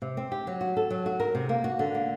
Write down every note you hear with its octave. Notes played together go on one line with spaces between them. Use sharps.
C3
C4
G4
F#3
F#4
A4
F#3
F#4
A#4
C3
A#3
F#4
D3
A#3